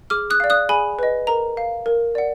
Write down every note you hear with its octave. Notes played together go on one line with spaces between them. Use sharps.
G#4 D6 F6
D#6 F#6
D5 F5
D#6 F#6
G#4 G#5 B5
B4 D#5
A#4 A#5
F5
A#4
D5 F#5